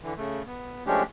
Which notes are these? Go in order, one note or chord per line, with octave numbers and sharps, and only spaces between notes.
D3 E3
C#3 A3
B3
F3 G#3 A3 C#4 D4 G4